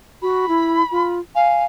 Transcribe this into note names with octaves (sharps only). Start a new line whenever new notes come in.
F#4 B5
E4
F4
F5 G#5